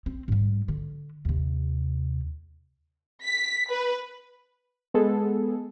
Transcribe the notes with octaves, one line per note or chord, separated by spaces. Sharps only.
C4
G#2 G3
D3
D#2 C3
B6
B4
G#3 B3 G#4 A4